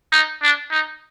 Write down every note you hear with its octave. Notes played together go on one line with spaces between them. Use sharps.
D#4
D4
D#4